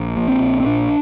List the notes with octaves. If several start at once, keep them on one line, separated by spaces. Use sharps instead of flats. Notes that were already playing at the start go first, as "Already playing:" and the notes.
Already playing: A#1
A#2
C4
A#1
C4
A#2 D4